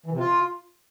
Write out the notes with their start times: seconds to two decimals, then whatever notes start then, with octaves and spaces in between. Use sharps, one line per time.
0.06 E3
0.13 C3
0.19 F4